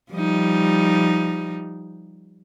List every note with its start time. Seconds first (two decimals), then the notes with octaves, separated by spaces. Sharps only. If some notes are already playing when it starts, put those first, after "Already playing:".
0.12 F3 G3 D#4